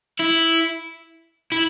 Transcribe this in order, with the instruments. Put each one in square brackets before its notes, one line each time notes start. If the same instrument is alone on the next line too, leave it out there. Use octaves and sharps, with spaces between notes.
[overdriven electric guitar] E4
E4